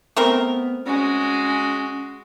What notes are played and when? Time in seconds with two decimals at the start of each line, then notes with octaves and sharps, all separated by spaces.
0.16 A3 B3 C4 A#4
0.86 G#3 C#4 F#4